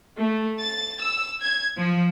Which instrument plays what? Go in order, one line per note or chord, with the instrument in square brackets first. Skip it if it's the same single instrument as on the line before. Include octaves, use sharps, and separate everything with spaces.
[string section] A3
A6
E6
G#6
F3